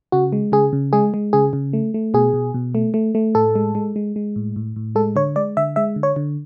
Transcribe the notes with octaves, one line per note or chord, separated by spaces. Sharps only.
C#3 F#4
G#3
C#3 G#4
C#3
G#3 G#4
G#3
C#3 G#4
C#3
A3
A3
B2 G#4
B2
B2
A3
A3
A3
A2 A4
G#3
G#3
G#3
G#3
A2
A2
A2
G#3 A4
D3 C#5
G#3 D5
D3 E5
G#3 E5
D3
C#5
D3